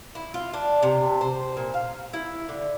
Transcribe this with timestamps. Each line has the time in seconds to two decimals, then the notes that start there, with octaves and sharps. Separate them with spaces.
0.15 E4
0.34 F4
0.54 D4
0.83 C3
1.21 C5
1.57 A#2
1.74 F5
2.13 E4
2.49 D3